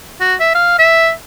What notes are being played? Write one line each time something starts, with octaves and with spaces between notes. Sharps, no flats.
F#4
E5
F5
E5